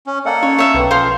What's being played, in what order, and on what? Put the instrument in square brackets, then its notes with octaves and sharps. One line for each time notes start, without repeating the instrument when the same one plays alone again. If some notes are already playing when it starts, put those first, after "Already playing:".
[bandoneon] C#4
[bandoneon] A#3 A4 F#5 [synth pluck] D5 D#5 F5
[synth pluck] C#4 [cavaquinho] C#5
[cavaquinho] C#5 E5 F5
[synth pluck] B1 B4 G5
[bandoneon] F3 [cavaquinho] C5 F5 C6